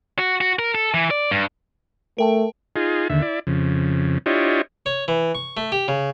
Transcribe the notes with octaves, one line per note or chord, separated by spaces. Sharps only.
F#4
F#4
A#4
A4
E3
D5
G2
A3 A#4 G5 A5
D#4 F4 G#4
D#2 D3 E5
E4 D5
F2 C#3
D4 E4 F4 G4 C#5 D#5
C#5
E3
C#6
A3
G4
C#3